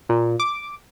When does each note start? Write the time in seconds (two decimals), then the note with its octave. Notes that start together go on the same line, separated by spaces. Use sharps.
0.09 A#2
0.40 D6